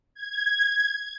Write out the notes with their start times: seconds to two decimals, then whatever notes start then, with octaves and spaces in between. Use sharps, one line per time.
0.14 G#6